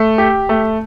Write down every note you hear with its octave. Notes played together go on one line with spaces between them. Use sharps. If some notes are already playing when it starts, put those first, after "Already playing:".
Already playing: A3
G4
A3